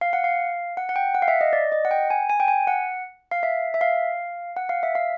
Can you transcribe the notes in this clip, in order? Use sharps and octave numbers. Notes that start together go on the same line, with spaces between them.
F5
F#5
F5
F#5
F#5
G5
F#5
F5
E5
D#5
D5
D#5
F#5
G5
G#5
G#5
G5
G#5
F#5
F5
E5
E5
F5
F#5
F5
E5
F5